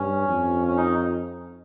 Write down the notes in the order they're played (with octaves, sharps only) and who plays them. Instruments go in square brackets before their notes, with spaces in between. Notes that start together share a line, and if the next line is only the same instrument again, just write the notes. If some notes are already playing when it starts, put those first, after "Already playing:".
Already playing: [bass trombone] G2 [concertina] C#4
[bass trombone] F2
[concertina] C#4
D#4